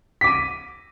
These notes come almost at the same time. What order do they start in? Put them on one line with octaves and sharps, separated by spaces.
B6 D6 D#7